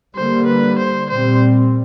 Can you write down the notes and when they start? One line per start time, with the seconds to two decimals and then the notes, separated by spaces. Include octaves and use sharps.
0.15 D3 G3 A#3 C5
0.46 B4
0.78 C5
1.10 A#2 G3 C4 C5